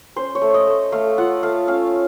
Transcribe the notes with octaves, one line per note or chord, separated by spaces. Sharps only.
C#4 C5
C#5
A3
D#5
A3
A3 F5
F4 F#5
A3 F5
C#4 F5